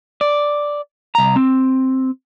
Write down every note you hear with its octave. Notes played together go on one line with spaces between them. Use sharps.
D5
C2 A#5
C4